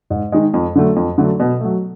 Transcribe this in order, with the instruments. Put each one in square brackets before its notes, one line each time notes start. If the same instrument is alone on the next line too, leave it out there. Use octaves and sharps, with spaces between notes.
[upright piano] G#2
D#3 G#3
F2
D3 F#3 A3
F2
D3 F#3 A3
B2
F#3 A3